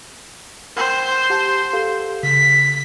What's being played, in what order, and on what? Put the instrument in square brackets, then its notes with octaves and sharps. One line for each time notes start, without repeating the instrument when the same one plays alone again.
[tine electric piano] A#4 F#5 G5 [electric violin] C5
[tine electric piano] G4 F#5 A5
G4 A4 F5
[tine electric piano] C#3 [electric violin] B6